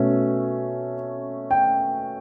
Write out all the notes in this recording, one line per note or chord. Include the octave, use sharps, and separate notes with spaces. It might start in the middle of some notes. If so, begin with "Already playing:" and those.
Already playing: B2 A3 C#4
G5